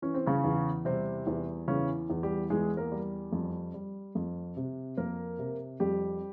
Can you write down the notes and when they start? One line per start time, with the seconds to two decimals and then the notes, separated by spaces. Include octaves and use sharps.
0.02 E3 C#4
0.14 C4
0.26 C#3 C#4
0.44 E2
0.85 C3 G3 C4
1.27 E2
1.68 C#3 E3 C#4
2.10 E2
2.23 G3 G4
2.50 E2 G#3 G#4
2.77 A#3 A#4
2.92 G3
3.32 F2
3.74 G3
4.15 F2
4.57 C3
4.97 F2 A#3 A#4
5.39 C3
5.80 F2 G3 G4